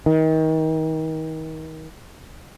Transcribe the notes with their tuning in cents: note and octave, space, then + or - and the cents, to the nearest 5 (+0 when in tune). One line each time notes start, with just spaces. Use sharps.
D#3 +30